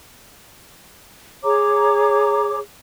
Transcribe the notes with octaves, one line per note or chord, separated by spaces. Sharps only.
G#4 C#5 A#5 D6